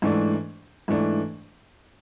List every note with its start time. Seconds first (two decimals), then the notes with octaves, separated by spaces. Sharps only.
0.02 G#2 E3 A3 D4
0.88 G#2 E3 A3 D4